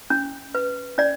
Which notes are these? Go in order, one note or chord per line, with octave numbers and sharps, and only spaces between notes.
C#4
B4
C#4 D5